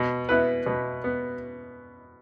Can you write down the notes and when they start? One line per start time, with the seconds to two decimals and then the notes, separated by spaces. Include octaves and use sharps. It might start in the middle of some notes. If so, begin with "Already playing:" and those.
Already playing: B2
0.29 B3 E4 B4
0.66 B2
1.04 B3